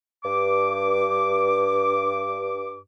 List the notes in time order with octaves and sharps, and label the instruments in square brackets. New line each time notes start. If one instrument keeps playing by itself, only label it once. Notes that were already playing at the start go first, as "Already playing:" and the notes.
[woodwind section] G2 D6